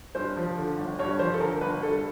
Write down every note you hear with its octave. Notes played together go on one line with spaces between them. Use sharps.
G2 C5
F3
D3
G1
G2 C#5
F3 C5
A4
D3 A#4
G1 B4
G2 A4